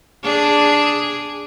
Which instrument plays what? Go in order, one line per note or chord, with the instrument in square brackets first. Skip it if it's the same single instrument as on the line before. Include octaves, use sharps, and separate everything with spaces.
[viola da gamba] D4 G#4